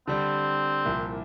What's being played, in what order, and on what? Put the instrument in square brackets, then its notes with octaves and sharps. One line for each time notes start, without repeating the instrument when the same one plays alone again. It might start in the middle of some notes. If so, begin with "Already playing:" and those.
[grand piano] D3 G3 D4 [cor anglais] C4
[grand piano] C2 A#2 F3 A#3 E4